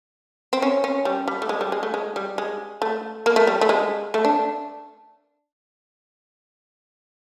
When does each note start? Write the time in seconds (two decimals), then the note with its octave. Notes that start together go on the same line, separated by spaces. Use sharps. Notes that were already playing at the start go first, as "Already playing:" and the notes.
0.53 C4
0.62 C#4
0.84 C#4
1.05 G3
1.28 G3
1.42 A3
1.49 G#3
1.61 G3
1.72 G#3
1.83 A3
1.94 G#3
2.16 G3
2.38 G#3
2.82 A3
3.26 A#3
3.36 A3
3.47 G3
3.61 A3
3.69 G#3
4.14 A3
4.25 D4